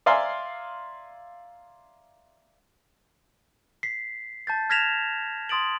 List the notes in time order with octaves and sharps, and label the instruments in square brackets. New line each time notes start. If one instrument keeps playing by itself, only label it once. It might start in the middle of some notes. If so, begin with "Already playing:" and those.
[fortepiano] D5 E5 F5 G#5 A#5 C6
[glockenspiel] B6 C7
A5 G6 A6
F6 G#6 A#6 B6 E7 F7
C6 D#6 A6 D7 F#7